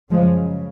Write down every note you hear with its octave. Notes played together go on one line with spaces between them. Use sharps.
F#2 C#3 F3 G#3